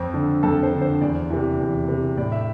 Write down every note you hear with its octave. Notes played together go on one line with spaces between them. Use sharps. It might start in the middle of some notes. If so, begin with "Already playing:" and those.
Already playing: F2 C4
D3
F2 A4
C5
D3
C5
E2 D5
C3 E3
E2
C3 E3
A2 D5
E5